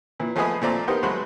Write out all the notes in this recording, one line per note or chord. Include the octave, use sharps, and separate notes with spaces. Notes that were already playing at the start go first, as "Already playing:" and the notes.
A#2 E3
F3 A3 B3 G#4 B4 D#5
A#2 F3 A3 C4 D5 A#5
B3 D#4 G4 A#4 C5
F#3 G#3 A3 F#4 B4 C5